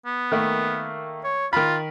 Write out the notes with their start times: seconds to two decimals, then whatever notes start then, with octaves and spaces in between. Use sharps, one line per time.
0.06 B3
0.32 D#3 A3 A#3
1.24 C#5
1.53 D#3 F4 B5